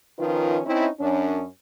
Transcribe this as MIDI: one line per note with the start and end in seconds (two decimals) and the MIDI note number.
0.19 0.61 51
0.19 0.61 53
0.19 0.61 61
0.19 0.61 63
0.19 0.61 65
0.19 0.61 71
0.66 0.87 60
0.66 0.87 61
0.66 0.87 63
0.66 0.87 64
1.00 1.45 42
1.00 1.45 61
1.00 1.45 62